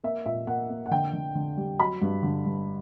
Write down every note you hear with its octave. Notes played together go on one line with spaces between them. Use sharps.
A#3 E5
A#2 E5
A#3 F#5
A#3
F#5
D3 G5
D3
D3
G3
F#3 B5
G2
D3
G2